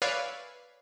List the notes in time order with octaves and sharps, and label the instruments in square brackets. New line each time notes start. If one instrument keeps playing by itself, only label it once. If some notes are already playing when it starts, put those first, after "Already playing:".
[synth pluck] B4 C#5 D5 E5 F5 G#5